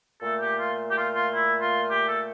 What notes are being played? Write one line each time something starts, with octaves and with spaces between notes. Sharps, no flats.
A#2 A3 A4
G4
F4
G4
F4
F4
E4
F4
G4
A4